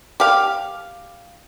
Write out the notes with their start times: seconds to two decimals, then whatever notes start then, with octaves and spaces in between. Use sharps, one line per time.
0.20 G4 F5